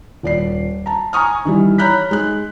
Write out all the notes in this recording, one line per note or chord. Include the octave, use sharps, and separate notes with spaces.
D#1 D5 C7
A5 A#5
G#5 A#5 C#6 D#6 F6
D#3 E3 G3
C#5 A#5 B5 F#6 G6 B6
G#3 D#4 F#6